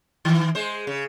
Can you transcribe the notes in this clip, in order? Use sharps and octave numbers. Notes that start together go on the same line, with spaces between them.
D#3 E3
G#3 C5
C#3